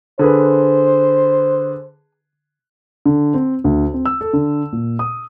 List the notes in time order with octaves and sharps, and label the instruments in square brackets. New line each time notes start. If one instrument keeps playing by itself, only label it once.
[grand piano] D3 G#4 B4 [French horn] C5
[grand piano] D3
C4
D2
C4
E6
A4
D3
A#2
D#6